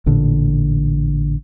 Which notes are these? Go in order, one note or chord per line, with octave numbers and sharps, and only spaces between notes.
A1 A#2 D3